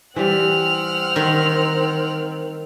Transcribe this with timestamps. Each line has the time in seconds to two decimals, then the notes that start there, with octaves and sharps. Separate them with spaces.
0.16 E3 G3 C4 F#5 F6
1.16 D#3